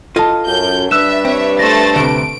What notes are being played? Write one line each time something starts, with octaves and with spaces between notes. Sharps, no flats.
F4 A4 D#5 F5 A5
F#2 G6
G2 D4 B4 E5 E6 F#6 E7
C4 C#5 E5
A3 C5 A6 A#6
D2 C3 D7